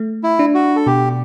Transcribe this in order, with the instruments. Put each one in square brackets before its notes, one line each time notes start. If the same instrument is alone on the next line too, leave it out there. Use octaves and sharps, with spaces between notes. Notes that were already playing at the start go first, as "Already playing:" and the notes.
Already playing: [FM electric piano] A3
[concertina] E4
[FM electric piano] D4
[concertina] F#4
A4
[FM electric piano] B2 [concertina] G4